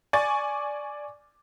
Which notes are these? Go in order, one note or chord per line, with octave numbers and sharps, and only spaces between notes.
D5 G#5 C#6 A6